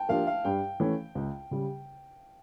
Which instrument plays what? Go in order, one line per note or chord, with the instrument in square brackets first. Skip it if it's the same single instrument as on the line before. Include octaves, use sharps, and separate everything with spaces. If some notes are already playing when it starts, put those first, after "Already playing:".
Already playing: [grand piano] G5 A5
[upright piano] F3 A#3 D4 G4 [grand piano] F5
[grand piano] F5
[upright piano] G2 [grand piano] G5
[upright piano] E3 A3 C#4
C#2
C#3 G3